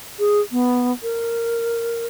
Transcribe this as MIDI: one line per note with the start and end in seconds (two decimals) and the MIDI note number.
0.19 0.40 68
0.52 0.92 59
1.03 2.07 70